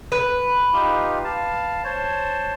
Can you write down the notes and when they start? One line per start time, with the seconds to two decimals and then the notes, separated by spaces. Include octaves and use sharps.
0.12 B4
0.73 D#4 F4 G4
1.24 F5 A5
1.84 C5 C#5 A5